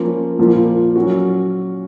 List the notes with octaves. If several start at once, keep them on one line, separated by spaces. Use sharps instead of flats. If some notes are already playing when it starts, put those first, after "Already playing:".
Already playing: F3 A#3 C#4 F4
A#2 F3 A#3 F4
F#3 C#4 F#4